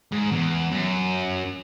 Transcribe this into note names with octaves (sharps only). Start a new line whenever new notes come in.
G#2
E2
F#2